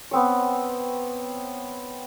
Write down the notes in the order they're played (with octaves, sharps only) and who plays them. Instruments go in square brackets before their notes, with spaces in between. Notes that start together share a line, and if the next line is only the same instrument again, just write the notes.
[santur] B3 C4 C#5